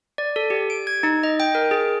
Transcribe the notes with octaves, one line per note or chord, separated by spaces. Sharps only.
D5
A4
G4
D7
G#6
D#4
D#5
G5
A#4
G#4